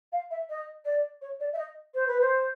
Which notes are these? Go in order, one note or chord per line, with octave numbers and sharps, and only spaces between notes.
F5
E5
D#5
D5
C#5
D5
E5
D#5
C5
B4
C5